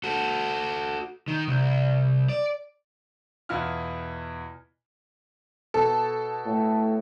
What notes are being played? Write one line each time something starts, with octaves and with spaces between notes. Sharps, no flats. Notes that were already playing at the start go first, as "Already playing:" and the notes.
F#4 A4
D#3
C2
D5
E2 B2 E4 F4 F6
B2 A4
A2